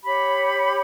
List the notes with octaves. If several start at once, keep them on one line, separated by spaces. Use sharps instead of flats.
G4 C#5 B5